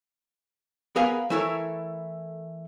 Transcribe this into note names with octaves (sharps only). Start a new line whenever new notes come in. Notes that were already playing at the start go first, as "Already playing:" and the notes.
B3 G#4 A#4 B4 F5 G#5
E3 A3 E4 A4 A#4 C#5